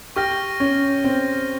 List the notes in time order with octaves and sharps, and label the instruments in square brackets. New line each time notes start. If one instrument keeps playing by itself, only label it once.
[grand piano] G4 [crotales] C#6 F6 A#6
[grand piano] C#4
C4